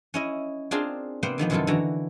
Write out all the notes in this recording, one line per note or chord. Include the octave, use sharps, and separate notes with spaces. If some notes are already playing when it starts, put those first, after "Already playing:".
C#4 E4 D#5
C4 D4 F4 G#4 A#4 C6
C3 A#3 B3 C5 F#5 G5
D3 D#3 F3 B3
F#2 C3 D#3 E4 F4 A4
D3 E3 F#4 A#5